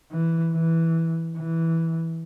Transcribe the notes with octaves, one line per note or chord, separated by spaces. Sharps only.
E3
E3
E3